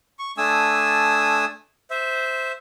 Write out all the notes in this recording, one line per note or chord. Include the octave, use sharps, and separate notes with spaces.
C#6
A3 D4 G#5 D#6 E6
C5 E5